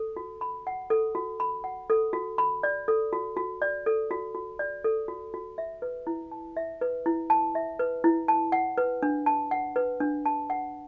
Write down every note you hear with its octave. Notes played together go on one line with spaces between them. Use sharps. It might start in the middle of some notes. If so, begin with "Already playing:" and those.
Already playing: A4
F#4
B5
F#5
A4
F#4
B5
F#5
A4
F#4
B5
D5
A4
F#4
F#4
D5
A4
F#4
F#4
D5
A4
F#4
F#4
E5
B4
E4
A5
E5
B4
E4
A5
E5
B4
E4
A5
F#5
B4
D4
A5
F#5
B4
D4
A5
F#5